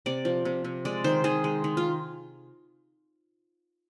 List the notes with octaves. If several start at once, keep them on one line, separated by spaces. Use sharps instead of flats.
C3 D5
F3
C3
C3
G#3 D5
D#3 C5
D#3 G#4
G#3
D#3
F4